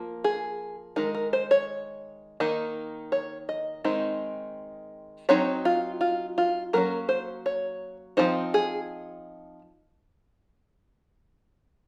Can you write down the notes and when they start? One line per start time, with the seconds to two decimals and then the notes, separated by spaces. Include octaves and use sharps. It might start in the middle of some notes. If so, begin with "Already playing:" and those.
Already playing: F3 A#3
0.24 G#4
0.96 D#3 G#3 D#4 A#4
1.15 A#4
1.33 C5
1.51 C#5
2.40 D#3 A#3 D#4
3.12 C#5
3.49 D#5
3.84 D#3 G#3 C4 D#4
5.29 F#3 C4 D#4 C#5
5.65 F4
6.01 F4
6.38 F4
6.73 F#3 A#3 C#4 A#4
7.09 C5
7.46 C#5
8.17 F3 C4 D#4 C5
8.54 G#4